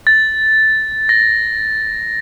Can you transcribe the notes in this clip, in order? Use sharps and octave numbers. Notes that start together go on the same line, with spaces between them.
A6
A#6